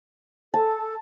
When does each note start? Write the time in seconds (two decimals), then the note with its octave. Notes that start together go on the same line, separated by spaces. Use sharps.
0.54 A4 A5